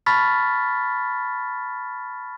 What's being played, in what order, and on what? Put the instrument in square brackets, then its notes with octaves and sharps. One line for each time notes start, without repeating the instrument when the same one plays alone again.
[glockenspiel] A5 B5 C#6 F6 A6 B6